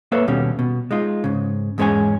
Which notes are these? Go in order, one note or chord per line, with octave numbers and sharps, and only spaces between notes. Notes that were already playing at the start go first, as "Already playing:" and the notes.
A#3 A4 B4 C#5 E5 F5
D#2 B2 G3 C#4
B2
G#3 D#4 F4
G#2 C#3
E2 G#2 G#3 C#4 C#5 G#5